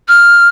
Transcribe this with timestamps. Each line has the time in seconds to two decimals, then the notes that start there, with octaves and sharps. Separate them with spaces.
0.08 F6